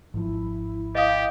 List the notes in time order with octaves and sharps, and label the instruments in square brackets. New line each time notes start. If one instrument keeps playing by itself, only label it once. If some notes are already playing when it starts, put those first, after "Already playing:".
[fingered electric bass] G#1 F3 [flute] E4
[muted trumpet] G4 [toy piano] D#5 F5 D#6